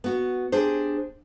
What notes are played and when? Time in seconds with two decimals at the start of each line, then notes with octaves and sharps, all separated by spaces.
0.04 B3 F#4
0.52 D4 G4 G#4 C5